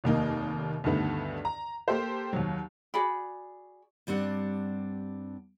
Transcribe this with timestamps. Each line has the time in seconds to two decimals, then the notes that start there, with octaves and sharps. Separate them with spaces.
0.04 F1 D#2 A#3 D#4
0.84 D2 G2 D#3 A3 B3
1.45 A#5
1.88 A#3 G4 A4 C5
2.33 D#2 F#3
2.94 F#4 G#4 D5 B5
4.07 G2 G3 C4 D4 F#5